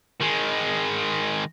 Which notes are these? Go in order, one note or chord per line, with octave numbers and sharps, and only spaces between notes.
D#3 G#3